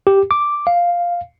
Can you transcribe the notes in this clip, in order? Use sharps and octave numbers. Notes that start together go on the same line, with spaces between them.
G4
D6
F5